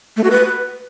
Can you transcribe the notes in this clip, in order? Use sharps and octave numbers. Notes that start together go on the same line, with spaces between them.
A3
F#4
B4